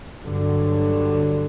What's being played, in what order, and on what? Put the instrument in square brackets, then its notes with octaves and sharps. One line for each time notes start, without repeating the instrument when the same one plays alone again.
[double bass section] G2 D3 F#3